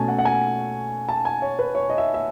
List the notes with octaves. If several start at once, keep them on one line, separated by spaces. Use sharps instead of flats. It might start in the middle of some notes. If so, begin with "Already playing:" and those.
Already playing: B2 A3 C#4 G#5 A5
F#5
F#5
G#5
A5
G#5
C#5
B4
C#5
D#5
E5
E5